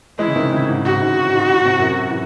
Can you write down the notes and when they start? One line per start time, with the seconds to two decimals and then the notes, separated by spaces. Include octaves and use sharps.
0.18 E3 G#3 E4
0.28 C#3
0.36 C3 D#3
0.52 A2 C#3
0.69 G#2
0.85 G#2 F#4
1.02 G#2
1.24 A2
1.35 G#2
1.52 A2
1.65 C3
1.79 F#2 A2
2.10 E3